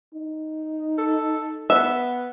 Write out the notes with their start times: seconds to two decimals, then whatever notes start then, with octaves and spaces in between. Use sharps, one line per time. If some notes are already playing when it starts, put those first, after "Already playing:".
0.13 D#4
0.98 A4
1.70 B3 E5